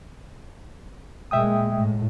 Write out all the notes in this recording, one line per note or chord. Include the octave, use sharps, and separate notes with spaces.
A#2 G#3 E5 G5 D#6
A2